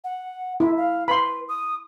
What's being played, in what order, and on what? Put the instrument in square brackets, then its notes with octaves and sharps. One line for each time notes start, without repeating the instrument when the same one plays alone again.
[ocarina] F#5
[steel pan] E4 [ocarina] E5
[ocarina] F5
[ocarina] B4 [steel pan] B5 C6
[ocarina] D#6